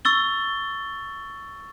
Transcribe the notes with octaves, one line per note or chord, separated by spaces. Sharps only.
C#6 E6 A6 G7